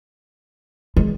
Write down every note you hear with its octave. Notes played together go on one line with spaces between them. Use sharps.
G#3